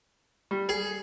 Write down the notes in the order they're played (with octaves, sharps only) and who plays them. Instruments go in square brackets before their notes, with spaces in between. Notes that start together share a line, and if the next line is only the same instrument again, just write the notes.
[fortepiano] G3
[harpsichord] G#4